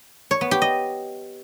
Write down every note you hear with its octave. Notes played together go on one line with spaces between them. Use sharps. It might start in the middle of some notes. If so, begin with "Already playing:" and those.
C#5
B3
G4
D#5